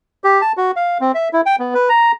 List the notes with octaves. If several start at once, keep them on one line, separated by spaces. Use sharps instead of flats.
G4
A5
F#4
F5
C4
E5
E4
G5
B3
B4
A#5